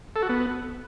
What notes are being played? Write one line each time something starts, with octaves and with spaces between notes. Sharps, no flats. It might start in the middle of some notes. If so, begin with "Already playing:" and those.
A4
F#4
B3